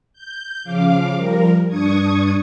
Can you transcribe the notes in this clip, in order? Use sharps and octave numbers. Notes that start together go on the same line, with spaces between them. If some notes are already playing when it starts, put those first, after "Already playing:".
G6
C#3 F3 F5 D6
F3 G3 A#4
G2 D4 C#6 D#6 G#6